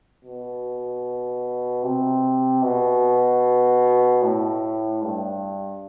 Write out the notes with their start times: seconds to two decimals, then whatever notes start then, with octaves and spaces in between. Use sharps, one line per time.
0.24 B2
1.83 C3
2.63 B2
4.22 A2
5.02 G2